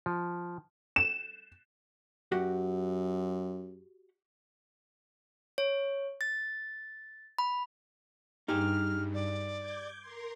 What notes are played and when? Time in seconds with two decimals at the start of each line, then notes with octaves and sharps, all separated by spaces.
0.06 F3
0.96 E7
2.32 F#2 F#4 G4 F#5
5.58 C#5
6.21 A6
7.38 B5
8.48 G2 D#4 G4 G#4 F6
9.14 D5
9.59 D6 G6 G#6
10.00 A#4 C6